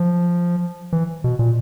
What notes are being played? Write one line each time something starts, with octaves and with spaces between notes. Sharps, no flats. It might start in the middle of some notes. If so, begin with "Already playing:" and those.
Already playing: F3
E3
B2
A#2